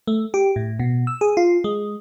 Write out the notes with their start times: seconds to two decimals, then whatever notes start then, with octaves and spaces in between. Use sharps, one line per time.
0.07 A3
0.34 G4
0.56 A2
0.79 B2
1.07 E6
1.21 G#4
1.37 F4
1.64 G#3